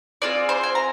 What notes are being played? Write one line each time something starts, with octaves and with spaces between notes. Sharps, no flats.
C4 F4 G#4 D5
C5
G#5
A#5